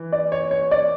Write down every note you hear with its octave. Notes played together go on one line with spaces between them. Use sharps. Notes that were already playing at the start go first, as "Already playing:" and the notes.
Already playing: E3
D5
C#5
C#5
D5